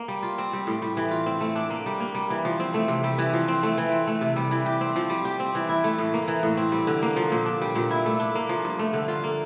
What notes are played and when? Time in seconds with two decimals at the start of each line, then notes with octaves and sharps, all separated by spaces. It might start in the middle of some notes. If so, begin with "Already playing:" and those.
Already playing: A#3
0.08 G3
0.23 F4
0.38 C4
0.53 G3
0.67 A2
0.82 G3
0.97 E3
1.11 F4
1.26 C4
1.41 A3
1.55 D4
1.70 A#3
1.86 G3
2.00 A#3
2.15 G3
2.30 E3
2.45 F3
2.60 C4
2.74 A3
2.88 C3
3.04 G3
3.18 E3
3.34 F3
3.48 C4
3.63 A3
3.77 E3
3.91 C4
4.07 A3
4.21 C3
4.36 G3
4.51 E3
4.66 G4
4.81 C4
4.96 F3
5.10 G3
5.25 G4
5.40 C4
5.55 E3
5.69 E4
5.84 A3
5.98 A2
6.14 A#3
6.28 E3
6.43 A2
6.57 C4
6.72 G3
6.87 D3
7.03 A#3
7.16 F3
7.32 A#2
7.46 D4
7.62 G3
7.75 A#2
7.91 E4
8.06 A3
8.20 D4
8.35 A#3
8.49 F3
8.65 G2
8.79 A3
8.93 D3
9.08 F4
9.24 A#3